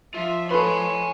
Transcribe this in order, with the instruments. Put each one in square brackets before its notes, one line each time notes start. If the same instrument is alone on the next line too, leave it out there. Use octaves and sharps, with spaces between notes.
[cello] F3 [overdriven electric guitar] F4 [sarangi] E5
[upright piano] A4 B4 [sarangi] C#5 [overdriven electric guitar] G#5 C6